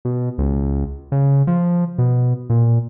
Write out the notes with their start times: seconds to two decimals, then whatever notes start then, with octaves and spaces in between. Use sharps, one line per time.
0.05 B2
0.38 C#2
1.12 C#3
1.47 F3
1.98 B2
2.50 A#2